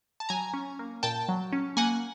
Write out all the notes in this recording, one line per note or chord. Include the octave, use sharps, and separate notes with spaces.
A5
F#3 G#5 A#5
C#4
A#3
A#2 G5 A5
F#3
C#4
A#3 F#5 G#5